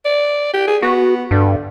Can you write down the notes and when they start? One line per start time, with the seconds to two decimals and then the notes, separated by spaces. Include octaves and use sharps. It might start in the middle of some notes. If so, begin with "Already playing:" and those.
0.05 D5
0.54 G4
0.67 G#4
0.82 B3 F#4
1.31 G2 D3